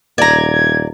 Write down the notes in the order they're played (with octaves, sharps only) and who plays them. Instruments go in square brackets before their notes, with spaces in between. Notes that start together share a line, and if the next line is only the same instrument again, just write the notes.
[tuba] D#1 [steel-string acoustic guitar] D5 A#5 [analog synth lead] G#6